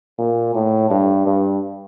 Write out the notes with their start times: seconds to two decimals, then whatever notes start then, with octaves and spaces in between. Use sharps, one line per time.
0.18 A#2
0.54 A2
0.90 G2
1.26 G2